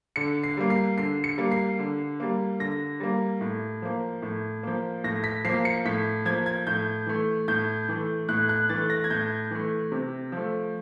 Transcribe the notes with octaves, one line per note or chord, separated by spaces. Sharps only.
D3 C#7
C7
G3 A#3
C7
D3 C7
C#7
G3 A#3
C7
D3
G3 A#3
D3 A#6
G3 A#3
A2
F3 A#3
A2
F3 A#3
A2 A#6
B6
F3 A#3 C7
C#7
A2 B6
F3 A#3 G#6
G#6
A2 G6
E3 A3
A2 G6
E3 A3
A2 F#6
F#6
E3 A3 A6
A#6
G#6
A2 G6
E3 A3
C3
F3 A3